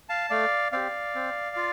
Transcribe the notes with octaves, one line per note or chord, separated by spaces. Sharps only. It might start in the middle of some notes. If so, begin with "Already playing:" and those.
F5 A5
A3 D5 F5
C4 G4 D5 F5
C4
F4